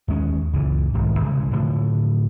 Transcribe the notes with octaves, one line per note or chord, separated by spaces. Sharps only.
D#2 G#3 C#4
F#1 C#2 A#2 E3
D1 B1 G#2 D#3
C2 C#3 G#3
A2 D3 F3